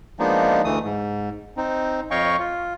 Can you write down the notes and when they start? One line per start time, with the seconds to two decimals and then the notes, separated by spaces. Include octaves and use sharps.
0.19 F3 G#3 A#3 B3 D4 D#4
0.65 D2 E3 A3 D#6
0.84 G#2
1.57 C4 D#4
2.11 F2 C#5 D#5 F5 G5 C#6
2.39 F4